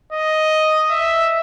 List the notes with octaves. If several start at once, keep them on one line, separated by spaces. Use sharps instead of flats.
D#5
E5